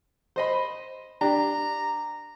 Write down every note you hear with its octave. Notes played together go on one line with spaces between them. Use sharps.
C5 D#5 B5
D4 G4 A#5